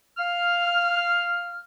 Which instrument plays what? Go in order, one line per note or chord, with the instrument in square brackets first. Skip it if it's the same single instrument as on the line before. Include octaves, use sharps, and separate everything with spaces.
[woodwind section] F5 F6